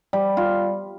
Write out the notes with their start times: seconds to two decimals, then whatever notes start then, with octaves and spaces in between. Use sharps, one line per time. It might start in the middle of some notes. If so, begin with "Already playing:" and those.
0.13 G3
0.37 F4